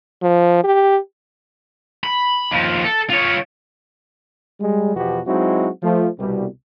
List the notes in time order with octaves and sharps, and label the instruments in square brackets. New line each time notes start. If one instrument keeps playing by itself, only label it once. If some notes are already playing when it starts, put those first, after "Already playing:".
[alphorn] F3
G4
[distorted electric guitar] B5
D#2 F3
A4
F4 C#5
[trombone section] G3 G#3
E2 B2 F3 B3 F#4 G4
F#3 G#3 C4 D#4 E4 F#4
F3 A3
C2 B2 G3